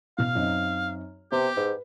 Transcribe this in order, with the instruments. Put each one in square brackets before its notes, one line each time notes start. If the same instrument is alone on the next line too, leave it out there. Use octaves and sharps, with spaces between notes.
[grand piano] B2 F6 [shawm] F5
[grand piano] F#2 C4 D#4
[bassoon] C3 [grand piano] B3 [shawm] G4
[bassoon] G#2 [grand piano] B4